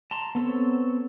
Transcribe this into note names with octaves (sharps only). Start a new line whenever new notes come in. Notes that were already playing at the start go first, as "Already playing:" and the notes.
A5 A#5 C6
B3 C4 A4 C#5